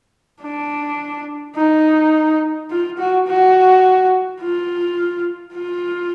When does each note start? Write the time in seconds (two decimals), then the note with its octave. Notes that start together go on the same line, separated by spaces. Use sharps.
0.42 D4
1.56 D#4
2.70 F4
2.98 F#4
3.27 F#4
4.41 F4
5.54 F4